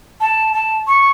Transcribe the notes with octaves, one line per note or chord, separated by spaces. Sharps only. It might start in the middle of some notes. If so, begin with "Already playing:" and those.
A5
A5
C#6